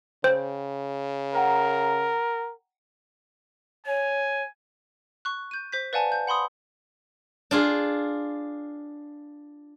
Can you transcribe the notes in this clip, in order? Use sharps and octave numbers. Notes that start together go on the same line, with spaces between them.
C#3 C5 G5
A#4 F#5 G5 A#5
C#5 G#5
C#6 F#6
G6 D#7
C5 G6 B6
B4 D5 F5 F#5 G#5 A5
G6
F#5 B5 C6 D#6
D4 F4 G#4